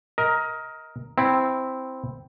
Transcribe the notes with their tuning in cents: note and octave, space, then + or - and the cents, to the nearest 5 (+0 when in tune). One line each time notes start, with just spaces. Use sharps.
A#4 +5 D#5 +25
C4 +0 E4 +0